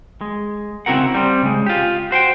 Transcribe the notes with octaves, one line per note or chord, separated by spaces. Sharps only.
G#3
C#3 C4 E4 F#4 A#4 F#5
G3 C4
C#3 G#3
F4 G4
F#4 C5 F#5 G5